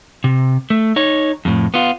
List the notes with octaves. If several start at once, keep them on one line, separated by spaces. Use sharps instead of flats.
C3
A3
D#4 C#5
F2 A2
B3 F4